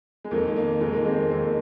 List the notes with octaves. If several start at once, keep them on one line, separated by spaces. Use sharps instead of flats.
G#3
F2 D#3 A#3
A#3
F2 D#3 G#3
A#3
G#3 C4
A#3
F2 D#3 A#3